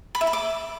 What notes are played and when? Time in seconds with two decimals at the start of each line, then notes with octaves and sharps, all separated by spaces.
0.15 B5
0.21 E5
0.27 B5
0.33 D6